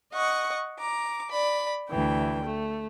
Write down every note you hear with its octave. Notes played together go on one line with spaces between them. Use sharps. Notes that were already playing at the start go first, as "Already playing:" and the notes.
D#5 F#5 C#6
A#5 D6
D5 B5
D2 E3 G5
A3